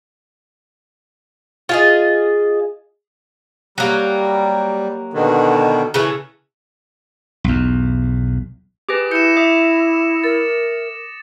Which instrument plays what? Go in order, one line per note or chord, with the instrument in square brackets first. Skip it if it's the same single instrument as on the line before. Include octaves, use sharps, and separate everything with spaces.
[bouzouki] F4 G#4 D#5
[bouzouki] F#3 A#3 G4 [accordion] G3
[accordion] B2 D3 D#3
[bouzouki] C#3 E3 A3
[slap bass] B1 E2
[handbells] G4 G#4 B4 [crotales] D6 D#6 A#6
[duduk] E4 [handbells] G6 [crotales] C#7 E7
[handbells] E5 [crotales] D#6
[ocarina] A#4 [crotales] A6